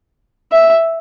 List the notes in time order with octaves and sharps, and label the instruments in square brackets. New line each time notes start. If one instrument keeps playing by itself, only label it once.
[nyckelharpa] E5